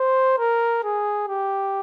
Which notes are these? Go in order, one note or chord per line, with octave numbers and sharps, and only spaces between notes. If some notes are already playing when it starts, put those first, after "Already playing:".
Already playing: C5
A#4
G#4
G4